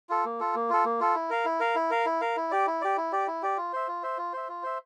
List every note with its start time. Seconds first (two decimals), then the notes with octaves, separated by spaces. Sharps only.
0.09 F4 A4
0.25 A#3
0.40 F4 A4
0.55 A#3
0.70 F4 A4
0.85 A#3
1.00 F4 A4
1.15 E4
1.30 A#4 F5
1.45 E4
1.60 A#4 F5
1.76 E4
1.91 A#4 F5
2.06 E4
2.21 A#4 F5
2.37 E4
2.51 G4 D5
2.67 E4
2.81 G4 D5
2.97 E4
3.12 G4 D5
3.27 E4
3.42 G4 D5
3.57 F4
3.73 C5 E5
3.88 F4
4.03 C5 E5
4.18 F4
4.33 C5 E5
4.49 F4
4.63 C5 E5